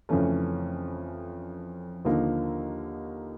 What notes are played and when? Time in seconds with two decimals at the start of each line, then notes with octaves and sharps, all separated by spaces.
0.09 F2 C#3 E3 A3 C#4
2.05 D#2 D3 F3 A#3 D#4